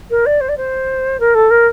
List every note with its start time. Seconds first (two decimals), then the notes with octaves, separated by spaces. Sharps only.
0.10 A#4
0.26 D5
0.40 C5
0.48 D5
0.57 C5
1.19 A#4
1.34 A4
1.50 A#4